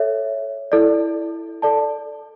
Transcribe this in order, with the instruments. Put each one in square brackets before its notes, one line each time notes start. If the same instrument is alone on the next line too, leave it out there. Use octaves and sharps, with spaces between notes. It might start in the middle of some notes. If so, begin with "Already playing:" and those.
Already playing: [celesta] A4 C#5 E5
E4 A4 D5
A4 D5 A5